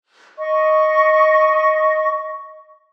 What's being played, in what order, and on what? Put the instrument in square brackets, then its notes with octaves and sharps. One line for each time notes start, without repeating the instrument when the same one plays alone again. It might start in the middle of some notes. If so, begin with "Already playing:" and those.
[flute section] D#5 C#6